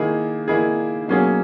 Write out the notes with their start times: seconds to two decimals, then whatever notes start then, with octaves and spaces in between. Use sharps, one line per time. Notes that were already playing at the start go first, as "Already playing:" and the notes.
Already playing: D#3 A#3 E4 G#4
0.48 D#3 A#3 E4 G#4
1.08 B2 F#3 A#3 C#4 G#4